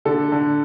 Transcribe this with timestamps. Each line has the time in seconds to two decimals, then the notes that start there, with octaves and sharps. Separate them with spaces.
0.05 D3 A4
0.32 D3